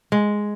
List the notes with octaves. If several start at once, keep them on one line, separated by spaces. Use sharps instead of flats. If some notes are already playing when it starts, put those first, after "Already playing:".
G#3